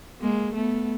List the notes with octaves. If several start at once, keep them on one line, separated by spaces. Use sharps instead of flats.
G#3 A#3
A3 B3